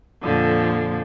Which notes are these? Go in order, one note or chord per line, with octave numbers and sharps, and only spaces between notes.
F2 A#2 D3 F3